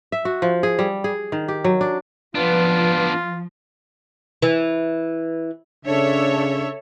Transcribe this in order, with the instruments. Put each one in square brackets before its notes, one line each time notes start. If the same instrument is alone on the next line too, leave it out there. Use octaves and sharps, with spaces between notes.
[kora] E5
F#4
F3
G#4
G3
G#4
D#3
G4
F#3
D4
[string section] F3 [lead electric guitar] B3 D4 [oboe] F4 [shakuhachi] B4
[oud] E3
[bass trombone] C#3 [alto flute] D4 [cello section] A4 C#5 E5